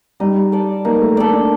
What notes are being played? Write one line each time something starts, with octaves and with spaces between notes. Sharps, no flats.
G3 D#4
A4 D5
A#3 D#4
A3
A#3 A4 D5
D4